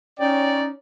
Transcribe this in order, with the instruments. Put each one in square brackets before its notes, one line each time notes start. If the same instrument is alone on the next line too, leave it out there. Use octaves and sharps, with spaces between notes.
[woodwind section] C#4 [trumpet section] D#4 D5 [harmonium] C#5 G5